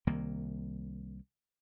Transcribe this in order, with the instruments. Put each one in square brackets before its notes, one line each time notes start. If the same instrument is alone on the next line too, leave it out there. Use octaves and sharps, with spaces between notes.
[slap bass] C2 D#3 A#3